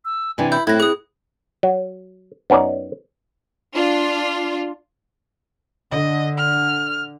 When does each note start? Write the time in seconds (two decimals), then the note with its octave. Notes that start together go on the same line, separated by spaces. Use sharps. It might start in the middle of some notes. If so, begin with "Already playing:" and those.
0.05 E6
0.38 C3 E3 D4 G#5
0.52 E4 B5 G6
0.67 A2 C4 E4 F#6 G#6 A#6
0.80 G#4 C#6 D#6
1.63 F#3
2.50 F#2 B3 C#4 D#4 D5
3.75 D4 F4
5.91 D3 D#5
6.38 F6